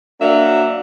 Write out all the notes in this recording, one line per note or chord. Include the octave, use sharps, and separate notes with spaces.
F#3 A#3 D4 E5